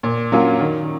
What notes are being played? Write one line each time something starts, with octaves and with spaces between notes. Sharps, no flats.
A#2
F#3 A#3 C#4 F4
D#3